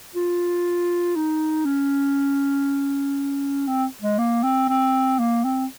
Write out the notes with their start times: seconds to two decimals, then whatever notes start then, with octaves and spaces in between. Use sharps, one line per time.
0.15 F4
1.16 D#4
1.65 C#4
3.67 C4
4.02 G#3
4.19 A#3
4.44 C4
4.69 C4
5.19 A#3
5.45 C4